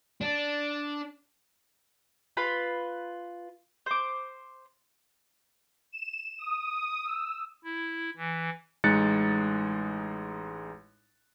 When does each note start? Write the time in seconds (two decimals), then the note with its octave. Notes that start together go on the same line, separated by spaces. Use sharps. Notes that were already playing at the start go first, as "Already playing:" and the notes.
0.21 D4
2.37 F4 B4 B5
3.86 C5 D6
5.92 E7
6.39 D#6
7.04 E6
7.64 E4
8.17 E3
8.84 A1 G#3 D#4 F#6 A6 C#7